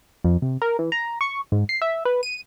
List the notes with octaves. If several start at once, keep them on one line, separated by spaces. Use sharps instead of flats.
F2
C3
A#4
E3
A#5
C#6
G#2
C7
E5
B4
D#7